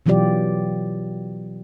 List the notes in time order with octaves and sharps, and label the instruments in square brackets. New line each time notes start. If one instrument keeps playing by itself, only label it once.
[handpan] B2 E3 F#3 F4 G4 D5